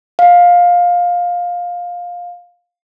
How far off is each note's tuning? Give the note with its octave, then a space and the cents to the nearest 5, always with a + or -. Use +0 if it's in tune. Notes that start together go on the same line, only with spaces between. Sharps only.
F5 +15